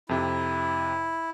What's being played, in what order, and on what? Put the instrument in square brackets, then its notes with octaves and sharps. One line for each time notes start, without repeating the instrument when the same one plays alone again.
[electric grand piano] F2 C3 [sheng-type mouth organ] E4